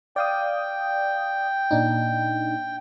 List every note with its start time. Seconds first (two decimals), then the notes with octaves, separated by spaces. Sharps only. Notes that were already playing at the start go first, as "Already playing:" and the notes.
0.16 D5 F5 G5 D#6
1.71 A#2 D4 D#4